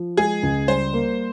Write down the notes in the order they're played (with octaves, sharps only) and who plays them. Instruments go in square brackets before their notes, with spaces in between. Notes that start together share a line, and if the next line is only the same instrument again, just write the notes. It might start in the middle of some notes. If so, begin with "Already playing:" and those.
Already playing: [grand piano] F3
[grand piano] G#3 [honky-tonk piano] G#4
[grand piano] C#2
[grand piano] G3 [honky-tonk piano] C5
[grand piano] A#3